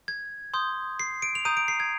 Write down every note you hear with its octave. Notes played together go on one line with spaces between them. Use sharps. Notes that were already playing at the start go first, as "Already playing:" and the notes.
G#6
C6 D#6 G6
C7
D7
F7
A#5 D#6 G6 D#7
D7
C7
G#6